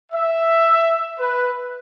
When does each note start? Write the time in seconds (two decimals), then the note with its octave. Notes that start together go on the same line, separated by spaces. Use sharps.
0.12 E5
1.19 B4